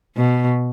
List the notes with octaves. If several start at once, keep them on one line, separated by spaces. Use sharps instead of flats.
B2